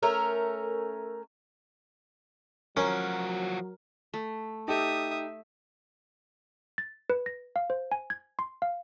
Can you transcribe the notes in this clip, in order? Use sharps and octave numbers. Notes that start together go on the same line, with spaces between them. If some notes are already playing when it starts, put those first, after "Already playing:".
A3 C#4 A#4
F3 F#3 C#4 F#4 A#4
A3
D#4 G4 A4 E5 D#6
A6
B4
A#6
F5
C5
G#5
G#6
C6
F5